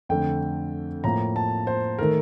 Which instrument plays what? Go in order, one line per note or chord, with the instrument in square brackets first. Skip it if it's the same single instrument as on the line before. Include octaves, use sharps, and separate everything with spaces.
[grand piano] F2 D3 A3 G5
A2 F3 A#3 A#5
A5
C5
D#3 A3 A#4